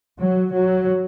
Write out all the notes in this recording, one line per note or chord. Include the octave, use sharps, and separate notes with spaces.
F#3
F#3